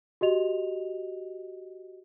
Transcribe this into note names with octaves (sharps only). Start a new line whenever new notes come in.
F#4 G4 D#5 F7